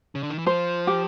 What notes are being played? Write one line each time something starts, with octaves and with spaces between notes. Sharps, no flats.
C#3
D3
D#3
E3
F3 C5
G4